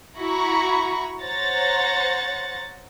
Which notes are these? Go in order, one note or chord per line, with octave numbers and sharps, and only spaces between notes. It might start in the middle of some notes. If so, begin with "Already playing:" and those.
E4 F#4 A#5 B5 C#6
C5 C#5 F#5 A#5 A6